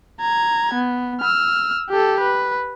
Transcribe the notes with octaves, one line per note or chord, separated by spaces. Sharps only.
A#5 G#6
B3
E6 F6
G4 A4
B4